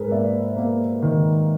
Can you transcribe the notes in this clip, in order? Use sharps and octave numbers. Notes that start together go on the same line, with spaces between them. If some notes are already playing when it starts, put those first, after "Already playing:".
Already playing: G#2 G#4 A#4 B4
A#3 D5 E5
A#3
D#3